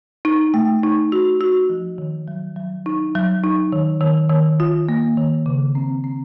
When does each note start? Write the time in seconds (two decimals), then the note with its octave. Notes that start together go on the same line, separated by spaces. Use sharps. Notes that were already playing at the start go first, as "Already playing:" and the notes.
0.25 D#4
0.54 A3
0.83 D#4
1.12 F#4
1.41 F#4
1.70 F3
1.98 D#3
2.28 F#3
2.56 F#3
2.86 D#4
3.15 F#3
3.44 D#4
3.72 D#3
4.01 D#3
4.30 D#3
4.60 F4
4.89 A#3
5.17 D#3
5.46 C#3
5.75 C4
6.04 C4